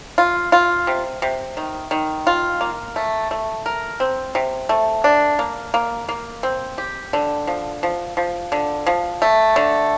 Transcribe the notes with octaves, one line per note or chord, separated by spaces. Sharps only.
F4
F4
C3
C3
D#3
D#3
F4
A#3
A3
A3
A#4
C4
C3
A3
D4
A#3
A#3
A#3
C4
G4
D3
F3
F3
F3
D3
F3
A3
D3